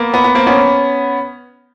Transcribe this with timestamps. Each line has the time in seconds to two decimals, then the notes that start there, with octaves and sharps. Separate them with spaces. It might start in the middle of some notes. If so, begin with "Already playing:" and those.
Already playing: A#3 B3
0.14 B3
0.24 B3
0.35 A#3 C4
0.47 B3 C#4